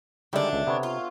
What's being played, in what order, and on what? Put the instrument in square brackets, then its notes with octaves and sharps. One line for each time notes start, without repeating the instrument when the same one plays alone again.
[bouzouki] D3 D4 [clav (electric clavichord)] D#3 G3 G#3 [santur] E5
[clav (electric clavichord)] C#2
[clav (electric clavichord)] C3 [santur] B3 C#5
[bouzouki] F4